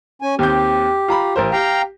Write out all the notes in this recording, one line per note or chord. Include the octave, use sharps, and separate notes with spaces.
C#4 G#5
D#2 C4 G4 G6
F4 A#5 B5
A1 A#4 C5
G4 F5 G5 A#5